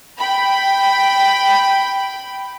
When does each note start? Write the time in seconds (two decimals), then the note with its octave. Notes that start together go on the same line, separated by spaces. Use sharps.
0.18 G5 B5